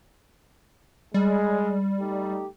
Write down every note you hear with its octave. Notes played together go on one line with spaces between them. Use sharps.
G3 G#3
A3 D#4 G4